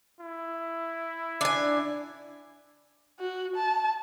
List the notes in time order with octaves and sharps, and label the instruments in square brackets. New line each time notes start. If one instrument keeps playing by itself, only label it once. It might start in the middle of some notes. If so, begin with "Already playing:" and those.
[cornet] E4
[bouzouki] D4 G#5
[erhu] F#4
A5